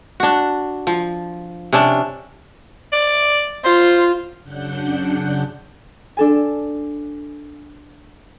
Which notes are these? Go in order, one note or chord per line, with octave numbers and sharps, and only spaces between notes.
D4 F#4
F3
C3 C#4 D4
D5
F4 C5
F#2 C#3 D4 F#5 G6
D4 A4 G#5